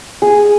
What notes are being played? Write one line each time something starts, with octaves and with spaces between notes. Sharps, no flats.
G#4